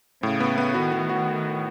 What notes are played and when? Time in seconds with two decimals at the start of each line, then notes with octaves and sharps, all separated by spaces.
0.23 A2 C#3
0.40 B3
0.58 B3
0.74 D#3 F#4
0.92 B3
1.09 F#4